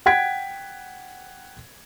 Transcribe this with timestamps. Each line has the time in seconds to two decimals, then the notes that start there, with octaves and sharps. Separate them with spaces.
0.06 F#5 G5 G#6 B6 D7